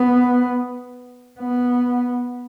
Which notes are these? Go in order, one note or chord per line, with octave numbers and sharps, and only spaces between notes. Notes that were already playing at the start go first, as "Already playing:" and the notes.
Already playing: B3
B3